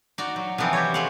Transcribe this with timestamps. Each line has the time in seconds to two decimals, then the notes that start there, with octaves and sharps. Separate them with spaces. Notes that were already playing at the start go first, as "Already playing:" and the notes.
0.18 D#4 F#4 D5 F#5
0.36 F#3
0.58 C3 E3 F3 B3 C4
0.73 G4 C#5
0.94 G#3 A3 F5 F#5